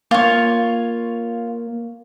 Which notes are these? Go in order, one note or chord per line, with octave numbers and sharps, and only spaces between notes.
A#3 F4 C#5